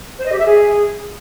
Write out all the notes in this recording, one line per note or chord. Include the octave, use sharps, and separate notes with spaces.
C5
D#5
G4
E5
G#4